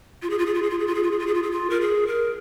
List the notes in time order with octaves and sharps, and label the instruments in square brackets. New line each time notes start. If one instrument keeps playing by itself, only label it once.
[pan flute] F4
G#4
F4
G#4
F4
G#4
F4
G#4
F4
G#4
F4
G#4
F4
G#4
F4
G#4
F4
A#4
G#4
A#4